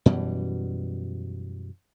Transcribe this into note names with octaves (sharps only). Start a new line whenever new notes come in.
F#2 B2 E3 G3